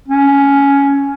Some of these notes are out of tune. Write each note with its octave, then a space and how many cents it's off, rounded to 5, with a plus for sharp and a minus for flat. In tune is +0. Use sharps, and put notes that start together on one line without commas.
C#4 +10